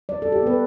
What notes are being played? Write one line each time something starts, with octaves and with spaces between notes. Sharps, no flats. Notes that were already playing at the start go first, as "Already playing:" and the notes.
G3 D5
A4
G4
B3 B4